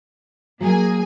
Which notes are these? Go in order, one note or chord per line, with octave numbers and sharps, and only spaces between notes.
F#3 A#3 G#4 G#5